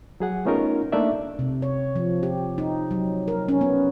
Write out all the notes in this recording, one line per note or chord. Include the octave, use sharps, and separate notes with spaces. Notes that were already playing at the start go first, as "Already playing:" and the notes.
F#3 G#4 F#5
A3 B3 C#4 D#4 F4 A#4
A3 A#3 D4 D#4 D5 E5
C3
C#5
F3
G4
D#4
F#3
A#4
C#4
B3